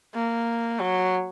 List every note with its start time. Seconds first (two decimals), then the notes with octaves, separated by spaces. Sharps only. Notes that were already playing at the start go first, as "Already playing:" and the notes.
0.14 A#3
0.79 F#3